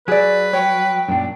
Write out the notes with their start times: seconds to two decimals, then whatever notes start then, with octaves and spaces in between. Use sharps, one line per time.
0.08 F#3 G#4 B4 D5
0.53 C#5 G5
1.09 F#2 A#2 D4